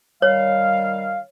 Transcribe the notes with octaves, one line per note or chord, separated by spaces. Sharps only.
D#3 G3 C#5 F5